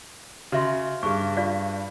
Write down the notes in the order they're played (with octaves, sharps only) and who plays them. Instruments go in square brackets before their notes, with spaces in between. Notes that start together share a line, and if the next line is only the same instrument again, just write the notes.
[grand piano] C#3 [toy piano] F#4 E5 C6
[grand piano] G2 [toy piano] G#4 C#6
[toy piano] F4 D5 F5